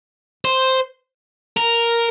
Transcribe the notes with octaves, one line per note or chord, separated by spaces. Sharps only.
C5
A#4